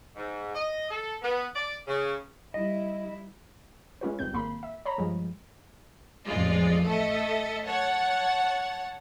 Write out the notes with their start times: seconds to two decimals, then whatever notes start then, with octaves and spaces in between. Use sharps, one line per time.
0.16 G#2
0.54 D#5
0.90 A4
1.22 B3
1.55 D5
1.87 C#3
2.54 G3 E4 D#5
4.01 G#3 C#4 F4 B4
4.19 G1 G#2 C4 G6
4.33 G#1 A#3 B5 C6
4.63 E5
4.85 C#5 A#5 B5
4.98 G2 F3 G#3
6.26 A1 F2 G#3 F4 D5
6.85 A3 A4 D#5 E5
7.65 C#5 F#5 A5